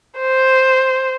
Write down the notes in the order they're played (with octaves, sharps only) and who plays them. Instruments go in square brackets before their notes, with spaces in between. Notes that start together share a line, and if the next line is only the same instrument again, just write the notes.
[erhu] C5